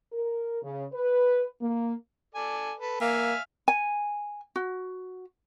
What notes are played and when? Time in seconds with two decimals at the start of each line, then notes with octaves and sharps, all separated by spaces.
0.13 A#4
0.63 C#3
0.93 B4
1.61 A#3
2.35 A4 D5 G#5
2.79 A4 B4
3.01 A#3 E5 F5 G#5
3.68 G#5
4.56 F#4